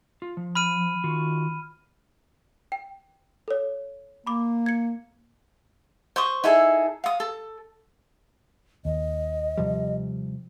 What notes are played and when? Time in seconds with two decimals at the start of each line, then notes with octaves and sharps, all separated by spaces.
0.22 F4
0.37 F3
0.55 B5 F6 D#7
1.04 D#3 F4 F#4
2.72 G5
3.48 A4 C#5
4.27 A#3 B5 D6
4.66 G#6 C#7
6.16 C5 C6 C#6 D#6
6.44 D#4 E4 G#4 A4
7.04 F5 D#6
7.20 A4
8.85 D#2 D#5
9.57 C3 F3 G3